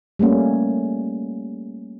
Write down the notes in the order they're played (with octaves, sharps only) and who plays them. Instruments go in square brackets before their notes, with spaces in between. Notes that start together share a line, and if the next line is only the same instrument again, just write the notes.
[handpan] G3 A3 A#3 C#4